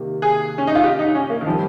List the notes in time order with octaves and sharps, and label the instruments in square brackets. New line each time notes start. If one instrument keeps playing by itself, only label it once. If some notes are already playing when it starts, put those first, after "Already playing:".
Already playing: [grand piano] C3 D#3 A#3
[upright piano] G#4
C#4
D#4
F4
G4
D#4
C#4
A#3
D#3
[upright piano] F3 [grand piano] G3 C4